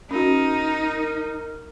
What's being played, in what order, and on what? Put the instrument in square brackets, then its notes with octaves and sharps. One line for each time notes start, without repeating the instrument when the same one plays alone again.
[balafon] C#4 F#4 [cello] D#4 [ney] A#4